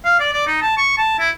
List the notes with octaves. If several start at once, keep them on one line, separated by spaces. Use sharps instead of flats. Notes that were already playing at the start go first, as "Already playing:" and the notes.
F5
D5
D5
D#4
A5
C#6
A5
E4